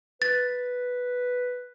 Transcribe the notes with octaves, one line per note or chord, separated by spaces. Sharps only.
B4 A6